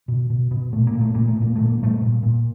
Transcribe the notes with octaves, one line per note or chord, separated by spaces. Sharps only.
B2
B2
B2
A#2 A3
A#3
A#2
A3
A#2 A#3
A3
A#2 A#3
A#2 A3
A#3
A#2 G3 A3
A#2
A#2